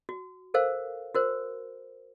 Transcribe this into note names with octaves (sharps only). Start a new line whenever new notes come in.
F#4
A4 A#4 C5 F5
F#4 A#4 C5